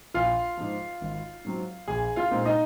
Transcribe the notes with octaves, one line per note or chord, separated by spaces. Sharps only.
A#1 F4 F5
G#2 F3
G#1
G#2 F#3 C4
A#1 G#4 G#5
F4 F5
A#2 G#3 C4 D#4
D#4 D#5